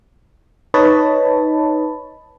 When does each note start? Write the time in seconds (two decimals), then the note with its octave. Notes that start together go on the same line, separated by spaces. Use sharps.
0.74 D#4 B4 C#5 D#5 A5 B5